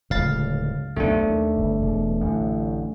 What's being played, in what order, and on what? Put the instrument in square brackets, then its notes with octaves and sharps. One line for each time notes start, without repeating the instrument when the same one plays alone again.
[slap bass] D1 G2 [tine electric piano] C#2 F5 A6
[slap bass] B1 F2 C3 [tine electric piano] A3 D4
[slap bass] D#2
G1
E1
A1 F#2 D3